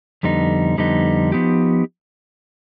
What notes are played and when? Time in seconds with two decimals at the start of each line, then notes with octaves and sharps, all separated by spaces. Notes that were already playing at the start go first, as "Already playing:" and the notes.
0.23 F2 D3 G3 B3 D#4
0.78 F2 D3 G3 B3 D#4
1.32 F3 B3 D#4 G4